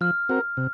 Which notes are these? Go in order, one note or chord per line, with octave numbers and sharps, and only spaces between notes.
F3 F6
C4 F#4 A#4
C3